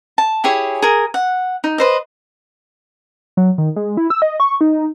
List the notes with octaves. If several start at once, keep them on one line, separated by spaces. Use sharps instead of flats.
A5
E4 G4 G#4 C#5
G#4 A#4
F#5
D#4
B4 C5 D#5
F#3
D#3
G#3
E4
E6
D#5
C#6
D#4